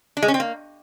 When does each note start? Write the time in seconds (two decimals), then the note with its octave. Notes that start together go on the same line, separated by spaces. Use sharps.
0.17 D4
0.23 G#3
0.28 C#4
0.34 C4
0.40 A#3